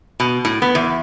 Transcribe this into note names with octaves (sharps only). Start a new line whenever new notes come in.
B2
A2
B3
E2